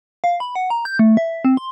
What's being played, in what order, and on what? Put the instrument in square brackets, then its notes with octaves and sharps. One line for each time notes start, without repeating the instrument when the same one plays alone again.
[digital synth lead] F5
B5
F#5
A#5
G6
A3
E5
C4
C6